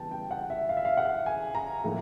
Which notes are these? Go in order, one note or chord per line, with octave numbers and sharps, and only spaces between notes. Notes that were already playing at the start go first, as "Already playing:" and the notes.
Already playing: C#3 E3 G3 B3 G5 A5
G5
F#5
E5
F5
E5
F5
F#5
G#5
A#5
A2 F3 A#3 D#4